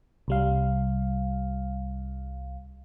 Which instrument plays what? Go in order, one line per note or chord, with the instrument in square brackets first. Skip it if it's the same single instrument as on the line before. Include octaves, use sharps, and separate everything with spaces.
[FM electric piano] C2 G3 F5